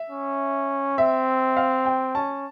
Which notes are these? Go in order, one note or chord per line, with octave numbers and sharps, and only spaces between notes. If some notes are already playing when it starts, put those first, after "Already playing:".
Already playing: E5
C#4
C4 E5
F5
G5
C#4 A5